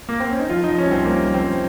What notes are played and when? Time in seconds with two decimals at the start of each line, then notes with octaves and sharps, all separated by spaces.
0.09 A#3
0.20 C4
0.30 C#4
0.40 D#4
0.49 F3 F4
0.64 D#4
0.69 F3
0.78 C#4
0.87 C2 C4
1.05 C2 A#3
1.24 F3
1.34 C4
1.42 C2